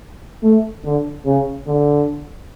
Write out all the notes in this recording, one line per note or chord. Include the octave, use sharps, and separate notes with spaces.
A3
D3
C#3
D3